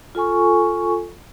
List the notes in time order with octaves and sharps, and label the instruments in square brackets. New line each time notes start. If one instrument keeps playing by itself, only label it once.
[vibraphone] F4 A4 G#5 C#6